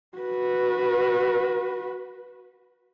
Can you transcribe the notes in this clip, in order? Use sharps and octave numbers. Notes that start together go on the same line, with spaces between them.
F#4 B4